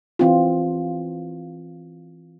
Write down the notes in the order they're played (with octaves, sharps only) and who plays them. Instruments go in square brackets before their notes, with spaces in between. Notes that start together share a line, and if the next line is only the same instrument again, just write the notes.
[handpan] E3 C4 F4